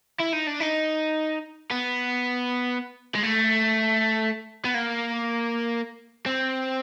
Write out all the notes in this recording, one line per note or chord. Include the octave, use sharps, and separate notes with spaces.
E4
D#4
D4
D#4
B3
G#3
A3
B3
A#3
C4